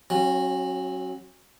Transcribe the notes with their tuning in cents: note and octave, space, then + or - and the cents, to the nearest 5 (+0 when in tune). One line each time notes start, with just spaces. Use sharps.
F#3 +0 C#4 -35